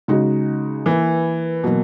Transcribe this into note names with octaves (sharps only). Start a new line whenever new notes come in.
C#3 G#3 D#4 F#4
E3 A#3 E4 B4
B2 F#3 A#3